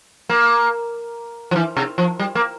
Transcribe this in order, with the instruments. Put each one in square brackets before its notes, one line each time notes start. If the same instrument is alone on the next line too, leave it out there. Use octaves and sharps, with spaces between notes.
[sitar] A#3
F3
E3
C3
F3
G3
A#3